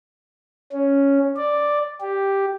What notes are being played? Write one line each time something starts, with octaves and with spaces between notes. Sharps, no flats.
C#4
D5
G4